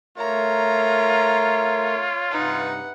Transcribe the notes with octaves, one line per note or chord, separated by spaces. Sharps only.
A3 F4 A#4 C#5 E5 A#5
G2 C3 D#4 B4 F#5